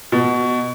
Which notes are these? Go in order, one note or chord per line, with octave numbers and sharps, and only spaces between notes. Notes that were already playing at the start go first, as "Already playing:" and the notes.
B2